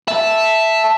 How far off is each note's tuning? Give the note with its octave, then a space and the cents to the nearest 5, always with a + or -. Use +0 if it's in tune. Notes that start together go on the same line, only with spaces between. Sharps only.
E5 +0 A5 +0